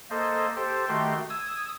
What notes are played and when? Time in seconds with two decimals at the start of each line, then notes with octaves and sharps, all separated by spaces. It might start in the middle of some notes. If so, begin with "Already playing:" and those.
0.10 A#3 A4 C5 D#5
0.56 G4 A4 C5
0.88 D#3 A3 F#4 G4 C6
1.30 D#6 E6 G#6